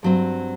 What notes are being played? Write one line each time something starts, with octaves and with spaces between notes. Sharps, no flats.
G2 F#3 C4